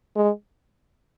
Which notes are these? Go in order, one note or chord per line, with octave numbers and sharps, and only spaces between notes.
G#3